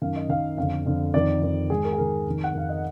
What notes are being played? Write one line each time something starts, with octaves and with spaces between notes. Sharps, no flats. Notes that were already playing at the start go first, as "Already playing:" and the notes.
F#2 D#3 F5
D#5
F#2 D#3 F5
F2 D3 F5
F2 D3
F2 D#3 D5
F2 D#3
G#2 D#3 G#4
A#4
G#4
G#2 D#3 A#4
F2 D#3
F#5
F2 D#3 F5
D#5